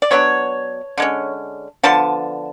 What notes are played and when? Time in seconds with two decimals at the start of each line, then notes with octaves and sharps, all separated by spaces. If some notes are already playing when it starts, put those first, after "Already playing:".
0.02 D5
0.11 F#3 B3 D4 C#5
0.98 D3 G#3 C#4
1.83 D3 F3 B3 A5